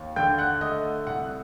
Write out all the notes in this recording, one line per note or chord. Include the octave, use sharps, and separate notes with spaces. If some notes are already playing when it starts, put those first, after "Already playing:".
Already playing: D#2
D3 G5 G6
F#5 F#6
A3 D#5 D#6
C2 F#5 F#6